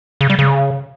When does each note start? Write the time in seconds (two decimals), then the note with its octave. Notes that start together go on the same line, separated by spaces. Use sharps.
0.21 C#3
0.30 G3
0.39 C#3